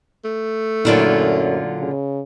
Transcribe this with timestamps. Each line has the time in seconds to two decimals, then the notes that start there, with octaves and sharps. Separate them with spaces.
0.25 A3
0.85 F#2 A#2 D3 F#3 C#4 E4 F4
1.80 C#3